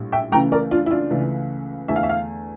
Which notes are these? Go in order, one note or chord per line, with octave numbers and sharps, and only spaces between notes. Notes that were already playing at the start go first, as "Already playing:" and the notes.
Already playing: A#1 A2 G3
E5 G5
C#2 C#3 E3 A3 G5 A#5
A#4 D5
D4 F4
E4
D4 F4
C#2 C#3 E3 A3
E2 D3 A3 E5
F5
E5
F5